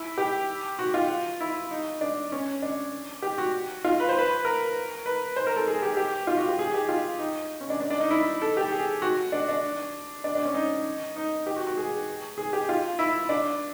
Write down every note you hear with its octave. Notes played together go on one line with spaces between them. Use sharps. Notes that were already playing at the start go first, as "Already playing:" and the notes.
Already playing: E4
G4
F#4
F4
E4
D#4
D4
C#4
D4
G4
F#4
F4
B4
C5
B4
A#4
B4
C5
A#4
A4
G#4
G4
G4
F4
F#4
G4
G#4
G4
F4
D#4
C#4
D4
D4
D4
D#4
E4
A4
G4
G#4
F#4
D4
D4
D4
D4
C#4
D#4
D#4
G4
F#4
F#4
G#4
G#4
G4
F4
E4
D4